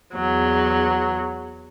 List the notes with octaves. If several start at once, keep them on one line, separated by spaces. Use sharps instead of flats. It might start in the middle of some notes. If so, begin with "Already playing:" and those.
E2 F#3